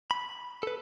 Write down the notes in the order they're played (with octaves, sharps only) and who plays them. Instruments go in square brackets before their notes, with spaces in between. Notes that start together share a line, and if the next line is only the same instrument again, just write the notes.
[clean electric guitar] B5
A4 B4